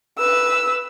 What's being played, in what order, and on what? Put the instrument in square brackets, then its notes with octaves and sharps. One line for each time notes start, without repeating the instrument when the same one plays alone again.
[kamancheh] B4 E6